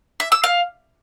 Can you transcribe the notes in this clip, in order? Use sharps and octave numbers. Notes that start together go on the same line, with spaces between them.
E5
E6
F5